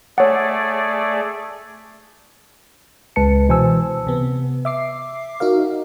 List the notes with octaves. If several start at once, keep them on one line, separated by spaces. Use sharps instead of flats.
A3 G#4 C#5 D5 F#5
C#2 G#3 B4 A5 C#7
B2 E3 C5 G#5 A5 E6
C3 B3
E5 D6 C7
D#4 F#4 A#4 F5